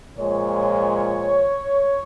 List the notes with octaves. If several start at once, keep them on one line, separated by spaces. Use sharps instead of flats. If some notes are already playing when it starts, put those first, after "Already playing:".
A#2 F3 G#3 C#5